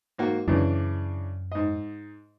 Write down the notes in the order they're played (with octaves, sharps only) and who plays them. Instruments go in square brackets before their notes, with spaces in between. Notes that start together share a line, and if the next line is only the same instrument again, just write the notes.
[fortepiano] G#2 A#3 F#4
[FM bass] F#2 [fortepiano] C#3 E3 D4
[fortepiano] G#2 D#5